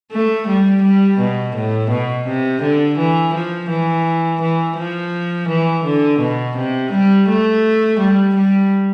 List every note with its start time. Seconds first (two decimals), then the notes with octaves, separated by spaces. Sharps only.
0.11 A3
0.48 G3
0.83 G3
1.19 B2
1.55 A2
1.90 B2
2.27 C3
2.62 D3
2.98 E3
3.34 F3
3.70 E3
4.41 E3
4.77 F3
5.48 E3
5.84 D3
6.19 B2
6.56 C3
6.92 G3
7.28 A3
7.99 G3
8.35 G3